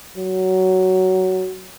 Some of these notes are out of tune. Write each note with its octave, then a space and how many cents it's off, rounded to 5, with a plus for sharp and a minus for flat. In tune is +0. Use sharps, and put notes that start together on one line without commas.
F#3 +15